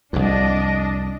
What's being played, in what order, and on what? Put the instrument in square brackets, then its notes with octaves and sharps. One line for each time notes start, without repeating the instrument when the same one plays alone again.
[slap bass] C2 F2 [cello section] D4 D#5